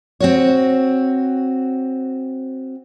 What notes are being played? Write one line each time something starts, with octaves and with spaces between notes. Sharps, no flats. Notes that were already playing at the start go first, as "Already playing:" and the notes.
C4 F#4 C#5